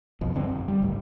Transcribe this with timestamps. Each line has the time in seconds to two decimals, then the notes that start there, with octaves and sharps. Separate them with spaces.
0.21 B1 F2 B2 F3
0.34 D#1 G2 D3 C4
0.49 F#1
0.68 G3
0.82 G1 C#2 A2